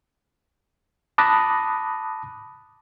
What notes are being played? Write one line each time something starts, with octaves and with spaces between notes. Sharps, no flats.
A5 B5 D6 D#6 F#6 A#6